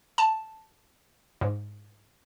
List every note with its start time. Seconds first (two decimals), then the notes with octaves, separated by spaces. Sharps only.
0.18 A5
1.41 G#2